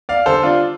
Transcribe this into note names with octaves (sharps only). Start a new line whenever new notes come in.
D5 F5
D3 G3 A4 C5
D4 F4